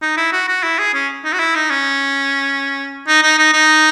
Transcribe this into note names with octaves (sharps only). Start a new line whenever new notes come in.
D#4
E4
F#4
F#4
E4
G#4
C#4
D#4
F#4
E4
D#4
C#4
D#4
D#4
D#4
D#4